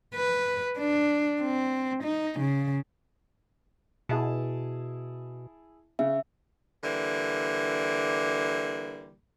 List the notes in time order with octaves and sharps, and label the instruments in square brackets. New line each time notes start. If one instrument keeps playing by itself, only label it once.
[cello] B4
D4
C4
D#4
C#3
[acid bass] B2 [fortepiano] E4 G#4 A5
[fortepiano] C#3 [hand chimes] E5
[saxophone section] D3 E3 G3 A#3